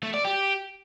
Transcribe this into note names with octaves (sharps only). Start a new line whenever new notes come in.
A3
D5
G4